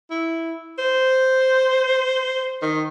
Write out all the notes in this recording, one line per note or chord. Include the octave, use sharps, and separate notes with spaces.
E4
C5
D#3